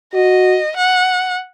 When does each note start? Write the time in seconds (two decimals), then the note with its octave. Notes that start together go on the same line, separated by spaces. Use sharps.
0.14 F#4 D#5
0.77 F#5